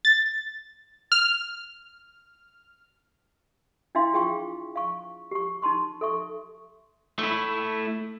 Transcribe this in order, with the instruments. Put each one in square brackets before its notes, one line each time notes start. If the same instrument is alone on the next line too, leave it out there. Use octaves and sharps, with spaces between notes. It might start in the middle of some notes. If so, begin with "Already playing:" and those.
[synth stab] A6
F6
[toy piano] D4 E4 E5 F5 G5 C6
F4 G#4 F5 G5 C6 C#6
F5 C#6
G4 C#6
D#4 A5 C6 C#6
A4 E5 C#6
[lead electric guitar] A3 E4